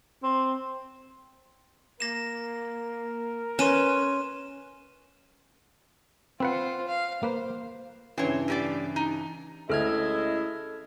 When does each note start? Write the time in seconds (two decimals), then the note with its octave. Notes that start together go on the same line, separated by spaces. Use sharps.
0.23 C4
2.00 A#3 A#4 A#6 E7
3.59 C#4 B4 C6 D#7 E7
6.40 C4 F4 B4 C5 F#5
6.88 F5
7.23 A#3 B4 C5
8.18 G2 C#3 E3 C4 C#5
8.48 A2 G4 D5
8.96 D#4
9.70 D2 G#3 C#4 E4 A4 D#5 F6 G#6